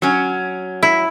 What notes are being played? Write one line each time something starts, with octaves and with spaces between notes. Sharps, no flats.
F#3 C#4
E4